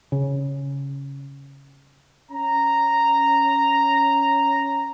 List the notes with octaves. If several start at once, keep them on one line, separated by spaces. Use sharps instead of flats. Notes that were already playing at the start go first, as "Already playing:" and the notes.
C#3
C#4 A#5